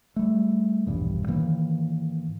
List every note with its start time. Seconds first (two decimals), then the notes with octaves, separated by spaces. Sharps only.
0.16 G3 A3
0.87 A#1 E2 G2 B2
1.27 G#2 D#3 E3 A#3